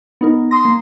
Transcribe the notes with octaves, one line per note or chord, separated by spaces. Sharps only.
B3 D#4 A#4
C6 D#6 A#6
A#3